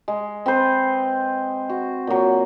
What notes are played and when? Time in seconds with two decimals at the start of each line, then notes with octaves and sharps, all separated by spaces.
0.08 G#3
0.46 C4 B4 C5
1.69 F#4
2.07 A#2 F#3